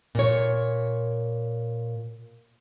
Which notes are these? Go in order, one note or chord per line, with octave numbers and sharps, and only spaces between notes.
A#2 C#5